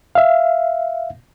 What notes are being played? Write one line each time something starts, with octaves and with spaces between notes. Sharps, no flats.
E5 F5